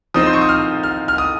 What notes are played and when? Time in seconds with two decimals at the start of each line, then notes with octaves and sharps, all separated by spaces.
0.14 F3 C4 D#4 D#6
0.26 C6
0.33 C#6
0.41 D#6
0.49 F6
0.83 F6
1.08 F6
1.18 D#6